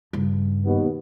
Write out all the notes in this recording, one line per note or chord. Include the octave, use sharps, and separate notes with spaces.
G2 C#3
D#2 B2 B3